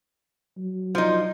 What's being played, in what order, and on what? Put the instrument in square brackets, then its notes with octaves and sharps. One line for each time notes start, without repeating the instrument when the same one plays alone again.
[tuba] F#3
[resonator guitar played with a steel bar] F3 D#4